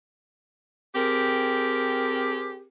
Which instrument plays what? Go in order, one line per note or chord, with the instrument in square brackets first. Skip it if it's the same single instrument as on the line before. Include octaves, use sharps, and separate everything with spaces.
[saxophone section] C4 G4 G#4 A#4